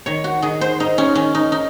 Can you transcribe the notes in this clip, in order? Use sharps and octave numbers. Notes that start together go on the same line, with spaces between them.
D#3 C#5
F#4
D#3 G#4
C5
G#2 D#4
C#4
D#3 C#4
D#4
D#4